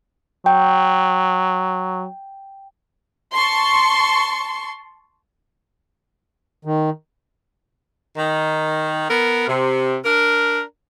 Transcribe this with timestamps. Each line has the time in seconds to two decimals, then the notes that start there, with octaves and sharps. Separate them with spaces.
0.46 F#3 G5
3.35 A5 C6 C#6
6.65 D#3
8.16 D#3
9.08 B3 A#4
9.47 C3
10.03 D4 A#4